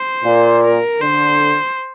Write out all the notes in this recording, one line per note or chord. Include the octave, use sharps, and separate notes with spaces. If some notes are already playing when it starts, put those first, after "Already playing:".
Already playing: C5
A#2
A#4
D3 C5